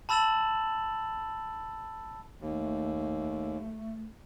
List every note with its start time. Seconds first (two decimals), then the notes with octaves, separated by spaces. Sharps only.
0.09 A5 B5 E6 A6 E7 F#7
2.40 D#2 A3